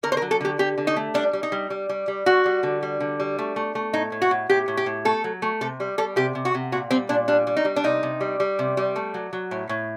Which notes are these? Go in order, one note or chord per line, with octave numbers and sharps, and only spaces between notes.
D3 A#4
C5
A#4
F#3
A4
D3 G4
D3 G4
D3
D#4
A3
G3 D4
G3
D#4
G3
G3
G3
G3
G3 F#4
G3
D3
G3
D3
G3
A3
A3
A3
A2 D#4
A2
F#4
A2
A2 G4
A2
G4
A2
A3 A4
F#3
A3
C3 A4
G3
G3 A4
C3 G4
C3
F#4
C3
A#2 F#4
G3 C4
A#2 D4
G3 D4
G3
D#4
G3
D4
C3 D#4
C3
G3
G3
C3
G3
A3
F#3
F#3
A2
A2